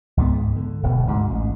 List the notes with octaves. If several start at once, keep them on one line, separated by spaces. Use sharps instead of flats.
C#2 G#2 G3 B3
D3
D1 G1 B2
D2 G#2
A1